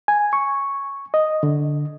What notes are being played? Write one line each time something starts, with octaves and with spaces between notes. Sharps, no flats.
G#5
C#6
D#5
D3